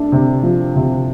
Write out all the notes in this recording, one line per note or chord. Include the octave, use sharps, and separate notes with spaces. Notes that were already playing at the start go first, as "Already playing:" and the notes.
Already playing: A3 D4
C3
F3
C3